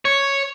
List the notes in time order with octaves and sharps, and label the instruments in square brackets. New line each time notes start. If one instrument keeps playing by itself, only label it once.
[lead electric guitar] C#5